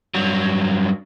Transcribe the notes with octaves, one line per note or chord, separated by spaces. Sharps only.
G2 F#3